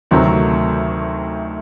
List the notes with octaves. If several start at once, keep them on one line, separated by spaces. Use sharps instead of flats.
D2 C3 D#3 F#3 A3